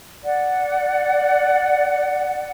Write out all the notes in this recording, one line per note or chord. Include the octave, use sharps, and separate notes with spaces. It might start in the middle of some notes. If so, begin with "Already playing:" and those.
D5 F#5